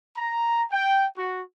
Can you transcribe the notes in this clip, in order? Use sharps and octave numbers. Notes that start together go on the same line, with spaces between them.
A#5
G5
F#4